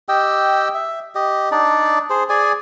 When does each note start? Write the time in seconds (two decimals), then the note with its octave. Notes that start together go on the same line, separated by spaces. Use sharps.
0.09 G4 D#5 G5 E6
0.74 E5
1.15 G4 D#5
1.52 D4 D#4 D5
2.10 G#4 C5
2.29 G#4 D5 G#5